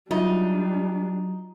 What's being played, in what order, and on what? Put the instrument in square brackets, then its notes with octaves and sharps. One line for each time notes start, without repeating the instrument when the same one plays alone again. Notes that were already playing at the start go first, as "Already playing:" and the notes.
[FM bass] F#3 [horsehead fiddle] G3 D4 [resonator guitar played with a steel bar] D#4 [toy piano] F4 D#5 E5